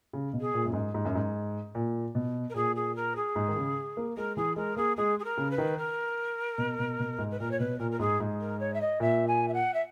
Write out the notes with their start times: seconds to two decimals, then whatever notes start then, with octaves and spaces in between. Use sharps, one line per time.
0.13 C#3
0.33 B2
0.40 G#4
0.54 A#2
0.66 F#2
0.73 G#2
0.94 G#2
1.05 F#2
1.15 G#2
1.75 A#2
2.15 B2
2.50 A#4
2.55 A#2 G#4
2.76 G#4
2.96 A#4
3.16 G#4
3.36 G#2
3.48 D#3
3.57 C#3
3.97 A#3
4.17 G#3 A#4
4.37 E3 G#4
4.56 G#3 A#4
4.76 A#3 G#4
4.97 G#3 G#4
5.19 G#4
5.24 A#4
5.38 C#3
5.51 B4
5.58 D#3
5.78 A#4
6.58 B2
6.79 B2
6.99 B2
7.18 G#2
7.31 B4
7.40 A#2 A#4
7.51 C#5
7.60 B2 B4
7.79 A#2 A#4
7.91 A#4
8.00 G#2 G#4
8.20 G#2
8.41 A#4
8.60 C#5
8.74 E5
8.81 D#5
9.00 A#2 E5
9.27 G#5
9.48 E5
9.54 F#5
9.74 E5